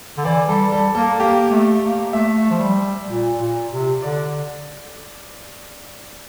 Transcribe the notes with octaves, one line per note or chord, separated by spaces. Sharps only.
D3
E3 D5
G3 A4
G3 A4
A#3 A4
A#3 G4
A3
A#3
A3 E5
F3
G3
A#2
A#2
C3
D3 D5